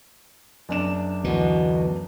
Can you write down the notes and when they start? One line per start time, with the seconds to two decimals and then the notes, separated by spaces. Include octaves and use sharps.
0.69 F#1 D4 E7
1.24 D2 B2 E3